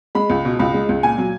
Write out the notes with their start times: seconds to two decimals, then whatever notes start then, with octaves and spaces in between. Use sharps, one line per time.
0.15 G#3 B5
0.30 C#2
0.45 B2
0.59 C#2 B5
0.74 G#3
0.89 C#2
1.03 A#2 G#5
1.18 F#3